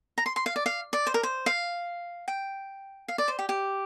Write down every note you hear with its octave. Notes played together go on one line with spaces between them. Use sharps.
A#5
C6
C6
F5
D5
F5
D5
C5
A#4
C5
F5
G5
F5
D5
C5
G4
G4